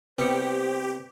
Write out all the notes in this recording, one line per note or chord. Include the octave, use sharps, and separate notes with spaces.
C2 C3 B3 G4 B4 C5 C#7